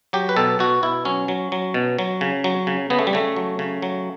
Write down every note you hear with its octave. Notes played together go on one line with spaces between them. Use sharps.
F#3 G4
B4
B2 A4
B2 F#4
B2 E4
F#3 C#4
F#3
F#3
B2
F#3
C#3
F#3
C#3
C#3 B3
A3
G3
C#3 A3
F#3
C#3
F#3